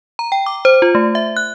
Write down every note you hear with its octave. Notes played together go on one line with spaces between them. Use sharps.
A#5
G5
D6
C5
F4
A3
E5
F#6